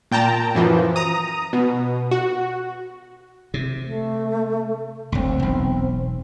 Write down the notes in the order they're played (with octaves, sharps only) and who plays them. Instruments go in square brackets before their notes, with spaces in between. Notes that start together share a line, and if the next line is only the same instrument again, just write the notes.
[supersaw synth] A#2 G5 A5 A#5
F#2 E3 F3
A#5 D#6
B2
F#4
[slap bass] C3
[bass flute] A3
[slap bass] F#1 D2 [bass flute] C4
[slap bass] E1 B1